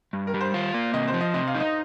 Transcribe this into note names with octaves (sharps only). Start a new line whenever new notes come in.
G2
A#4
G3
C5
F4
A#3
C3 D#5
C5
F3
D#5
C3 D#5
F5
D#4
D#5